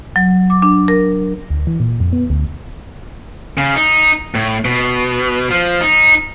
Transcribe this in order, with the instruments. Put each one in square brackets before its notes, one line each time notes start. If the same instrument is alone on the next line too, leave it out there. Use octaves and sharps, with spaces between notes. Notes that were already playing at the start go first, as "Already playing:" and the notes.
[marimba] F#3
D6
D4
A#4
[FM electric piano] D2
E3
A#2
F2
B3
D2
[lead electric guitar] C#3
D#4
A2
B2
F3
D#4